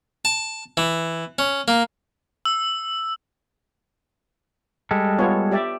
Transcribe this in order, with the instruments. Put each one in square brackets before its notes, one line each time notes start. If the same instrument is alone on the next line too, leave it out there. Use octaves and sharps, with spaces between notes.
[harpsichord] A5
E3
C#4
A#3
[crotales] E6
[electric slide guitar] G3 G#3 A4
[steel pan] B3 F4 C#5
G4 D5 E5